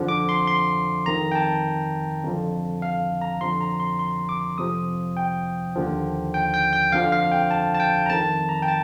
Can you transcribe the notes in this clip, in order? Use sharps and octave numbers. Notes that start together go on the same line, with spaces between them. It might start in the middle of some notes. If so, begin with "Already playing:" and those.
Already playing: F2 D3 F3
D6
C6
C6
F2 D#3 A#5
G5
A5
F2 D3 F3
F5
A#5
F2 D3 F3 C6
A#5
C6
C6
D6
F2 C3 F3 D#6
G5
D#2 D3 F3
G5
G5
G5
F2 D3 F3 F5
F5
G5
A5
A5
G5
A#5
F2 D#3 A5
A#5
G5
A5